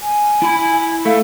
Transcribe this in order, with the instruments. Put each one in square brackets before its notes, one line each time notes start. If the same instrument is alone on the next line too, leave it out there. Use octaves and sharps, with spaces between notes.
[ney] G#5
[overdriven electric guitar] E4 B5
[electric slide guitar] A3 [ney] F5